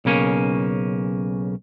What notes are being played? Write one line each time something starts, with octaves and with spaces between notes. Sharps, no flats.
B1 C#3 A#3 C#4